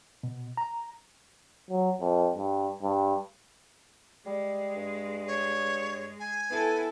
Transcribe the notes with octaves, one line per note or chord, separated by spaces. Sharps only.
B2
A#5
F#3
F2
G2
G2
G3 G#3
G2
C#5
G#5
B3 E4 A4